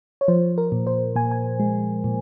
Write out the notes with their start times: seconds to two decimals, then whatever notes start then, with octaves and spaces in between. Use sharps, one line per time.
0.21 C#5
0.28 F3 C5
0.58 A#4
0.72 A#2
0.87 C5
1.16 A#2 G#5
1.31 G#5
1.60 G#3
2.04 A#2